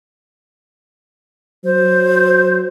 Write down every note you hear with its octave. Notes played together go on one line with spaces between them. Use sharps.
F#3 C5